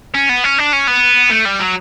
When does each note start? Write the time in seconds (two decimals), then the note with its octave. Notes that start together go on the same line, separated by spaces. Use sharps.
0.14 C#4
0.29 B3
0.44 C#4
0.58 D4
0.73 C#4
0.87 B3
1.31 A3
1.46 G3
1.60 F#3